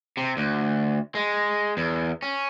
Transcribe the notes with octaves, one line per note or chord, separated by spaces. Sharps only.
C3
D2
G#3
E2
C#4